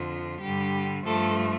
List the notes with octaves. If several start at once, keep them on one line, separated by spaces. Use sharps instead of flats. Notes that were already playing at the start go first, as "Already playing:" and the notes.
Already playing: F2 D3 F3
G2 D3 G3 G4
G2 F3 A3 A4